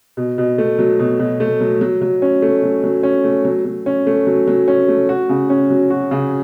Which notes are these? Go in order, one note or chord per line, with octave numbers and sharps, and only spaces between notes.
B2
B2
A3
F#3
B2
B2
A3
F#3
F#3
F#3
C#4
A3
F#3
F#3
C#4
A3
F#3
F#3
C#4
A3
F#3
F#3
C#4
A3
F#4
C#3
C#4
F#3
F#4
C#3